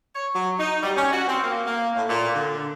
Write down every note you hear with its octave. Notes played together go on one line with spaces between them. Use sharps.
C#5
F#3
D#4
G3
C#4
F#4
C4
A#3
A#3
A2
A#2
D3